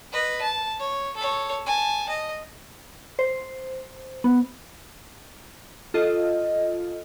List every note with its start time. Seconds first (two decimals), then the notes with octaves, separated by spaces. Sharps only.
0.12 B4 D#5
0.42 A5
0.80 C#5
1.16 A4 C#5
1.66 G#5 A5
2.09 D#5
3.19 C5
4.24 B3
5.94 F4 A4 D#5